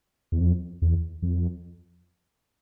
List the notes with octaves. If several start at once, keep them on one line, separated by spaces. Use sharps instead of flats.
E2
F2
E2
F2